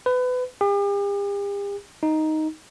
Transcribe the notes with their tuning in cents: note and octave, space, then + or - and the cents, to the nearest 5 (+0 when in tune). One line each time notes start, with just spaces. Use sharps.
B4 +25
G4 +45
D#4 +5